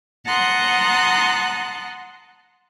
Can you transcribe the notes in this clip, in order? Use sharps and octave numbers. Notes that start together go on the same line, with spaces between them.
F#5 A5 A#5 C6 D#6 F#6